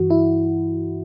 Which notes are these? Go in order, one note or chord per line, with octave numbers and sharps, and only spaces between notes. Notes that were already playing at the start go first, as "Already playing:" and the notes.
Already playing: G2 E3 F#4
E4